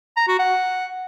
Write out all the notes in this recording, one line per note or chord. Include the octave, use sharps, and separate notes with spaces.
A#5
F#4
F#5